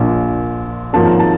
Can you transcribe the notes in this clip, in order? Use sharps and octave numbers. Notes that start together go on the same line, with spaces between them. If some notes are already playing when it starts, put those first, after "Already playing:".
Already playing: A#1 A#2 F3
G#1 G#2 F3 A#3 C#4 A5
A#5
A5